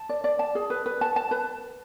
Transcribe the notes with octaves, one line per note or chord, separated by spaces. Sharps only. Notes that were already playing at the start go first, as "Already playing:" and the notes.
Already playing: A5
D5
D5
A5
G#4
B4
B4
A5
A5
B4